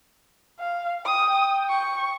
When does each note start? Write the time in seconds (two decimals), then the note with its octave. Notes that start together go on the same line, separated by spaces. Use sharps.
0.59 F5
1.05 G5 D#6
1.69 C#6